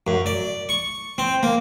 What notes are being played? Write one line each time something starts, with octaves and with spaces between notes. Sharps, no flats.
F#2
D5
C#6
C4
A#3